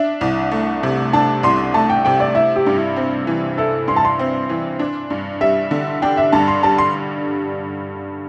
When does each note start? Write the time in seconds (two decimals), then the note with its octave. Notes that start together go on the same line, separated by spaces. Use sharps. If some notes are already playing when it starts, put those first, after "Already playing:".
Already playing: D4 E5
0.21 C2
0.52 A3
0.83 C3
1.13 D4 A5
1.43 C2 C6
1.74 A3 A5
1.90 G5
2.05 C3 G5
2.20 D5
2.35 E4 E5
2.56 G4
2.66 G2
2.77 E4
2.96 C4
3.27 E3
3.58 E4 A4
3.88 G2 C6
3.96 A5
4.05 C6
4.19 C4
4.49 E3
4.79 D4
5.10 G2
5.41 G3 E5
5.71 D3
6.02 D4 G5
6.17 E5
6.32 G2 A5
6.48 C6
6.63 G3 A5
6.78 C6